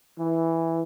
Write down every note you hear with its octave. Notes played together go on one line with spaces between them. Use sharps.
E3